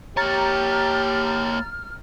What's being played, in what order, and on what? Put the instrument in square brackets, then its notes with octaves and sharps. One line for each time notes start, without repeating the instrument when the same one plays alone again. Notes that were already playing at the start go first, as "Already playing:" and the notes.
[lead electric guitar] A#3 C#5 [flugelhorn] G4 [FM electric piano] A#5 A6 [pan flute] F6